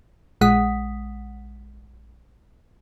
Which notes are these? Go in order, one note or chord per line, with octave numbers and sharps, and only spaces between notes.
A#1 G#3 F#5 D#6 B6